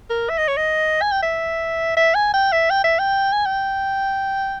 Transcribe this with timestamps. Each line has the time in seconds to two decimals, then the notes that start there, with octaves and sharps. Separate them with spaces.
0.10 A#4
0.29 E5
0.38 D#5
0.48 C#5
0.57 D#5
1.01 G#5
1.12 G5
1.23 E5
1.97 E5
2.15 G#5
2.33 G5
2.52 E5
2.70 G5
2.84 E5
2.99 G5
3.33 G#5
3.46 G5